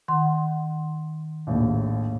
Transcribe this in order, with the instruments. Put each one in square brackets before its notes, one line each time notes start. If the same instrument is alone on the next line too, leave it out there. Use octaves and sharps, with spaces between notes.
[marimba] D#3 F#5 C6
[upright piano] A#1 D#2 A2